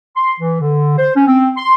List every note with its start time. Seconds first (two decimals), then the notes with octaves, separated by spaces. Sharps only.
0.16 C6
0.40 E3
0.60 D3
0.98 C5
1.15 C#4
1.27 C4
1.57 C6